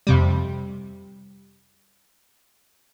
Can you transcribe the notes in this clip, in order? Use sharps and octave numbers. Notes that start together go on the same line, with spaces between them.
F2 C3 G3